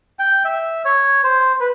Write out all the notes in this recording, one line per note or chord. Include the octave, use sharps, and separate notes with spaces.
G5
E5
C#5
C5
B4